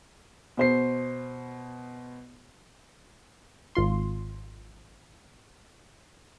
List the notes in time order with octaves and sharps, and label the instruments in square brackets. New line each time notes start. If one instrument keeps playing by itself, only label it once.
[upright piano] B2 C5 C7
[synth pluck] G#1 F4 C6